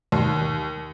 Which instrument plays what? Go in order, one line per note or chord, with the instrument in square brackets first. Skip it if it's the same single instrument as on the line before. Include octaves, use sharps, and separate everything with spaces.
[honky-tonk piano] D#2